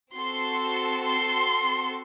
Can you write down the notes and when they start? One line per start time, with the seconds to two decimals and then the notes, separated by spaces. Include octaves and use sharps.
0.14 C4 F#4 A4 C6
1.03 C6